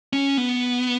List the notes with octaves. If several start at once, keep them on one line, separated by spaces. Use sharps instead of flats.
C#4
B3